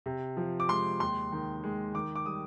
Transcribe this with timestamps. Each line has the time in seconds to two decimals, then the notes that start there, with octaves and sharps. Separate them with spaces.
0.06 C3
0.37 F3
0.60 D6
0.69 G#3 C6
1.00 D#2 C6
1.32 D#3
1.64 G#3
1.94 D#3 D6
2.15 D6
2.26 G3 D#6